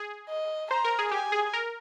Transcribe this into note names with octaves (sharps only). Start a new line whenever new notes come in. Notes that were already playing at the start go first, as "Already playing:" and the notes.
Already playing: G#4
D#5
C5 A#5
A#4
G#4
G4 G#5
G#4
A#4